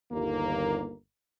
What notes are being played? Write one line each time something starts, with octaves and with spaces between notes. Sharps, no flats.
G1 D#2 A#3